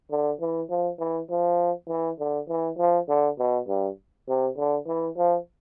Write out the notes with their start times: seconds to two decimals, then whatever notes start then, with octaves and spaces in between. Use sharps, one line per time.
0.11 D3
0.40 E3
0.70 F3
0.99 E3
1.29 F3
1.89 E3
2.19 D3
2.49 E3
2.78 F3
3.08 D3
3.38 B2
3.67 G2
4.28 C3
4.57 D3
4.87 E3
5.17 F3